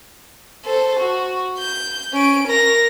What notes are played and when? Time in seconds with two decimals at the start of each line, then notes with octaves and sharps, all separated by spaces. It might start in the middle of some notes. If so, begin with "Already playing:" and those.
0.66 A4 C5
0.99 F#4
1.59 G6
2.13 C#4 D7
2.48 A#4 A#6